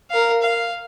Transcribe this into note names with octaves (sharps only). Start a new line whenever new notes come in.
A#4 F5
F5